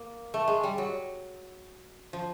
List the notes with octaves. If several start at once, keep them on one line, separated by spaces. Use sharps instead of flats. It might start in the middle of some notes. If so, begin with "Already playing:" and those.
Already playing: A#3
A3
G#3
G3
F#3
F3